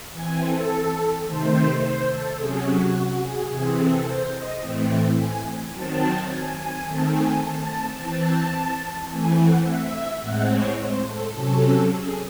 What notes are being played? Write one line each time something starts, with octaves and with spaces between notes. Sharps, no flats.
E3 C4 G#5
A4
C3 D#3 A3 C5
C5
A4
C3 F#3 C#4 G#4
F#4
F#4
G#4
C3 E3 C4 G#4
A4
C5
D#5
A2 E3 A3 C4
G#5
D#3 F#3 C4 A5
G#5
G#5
D#3 A3 C4 A5
G#5
A5
E3 C4 A5
E3 A3 C4 G#5
F#5
E5
A2 G#3 C4 F#5
C#5
C5
A4
C3 F#3 C#4 A4
G#4